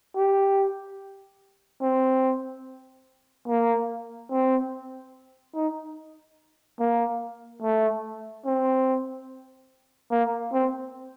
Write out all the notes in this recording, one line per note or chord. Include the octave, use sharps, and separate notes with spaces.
G4
C4
A#3
C4
D#4
A#3
A3
C4
A#3
C4